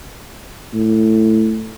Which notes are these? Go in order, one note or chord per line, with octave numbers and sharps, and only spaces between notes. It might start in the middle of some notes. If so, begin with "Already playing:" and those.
A2